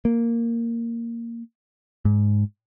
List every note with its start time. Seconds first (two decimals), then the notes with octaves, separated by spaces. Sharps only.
0.05 A#3
2.05 G#2